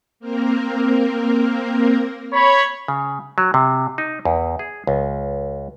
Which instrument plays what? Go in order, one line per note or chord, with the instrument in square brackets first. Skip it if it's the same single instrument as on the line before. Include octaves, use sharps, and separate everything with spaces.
[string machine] A#3 C4 A#4
[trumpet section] C#5 B5
[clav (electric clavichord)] C#3
F#3
C3
D#4
E2
G#4
C#2